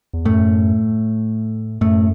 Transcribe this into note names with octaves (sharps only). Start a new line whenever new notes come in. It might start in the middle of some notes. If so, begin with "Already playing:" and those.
E2
F#2 A2 A3
F#2 A2 A3